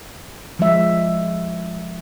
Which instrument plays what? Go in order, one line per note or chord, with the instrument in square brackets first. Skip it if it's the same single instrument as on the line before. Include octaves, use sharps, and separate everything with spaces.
[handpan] F3 G#3 E5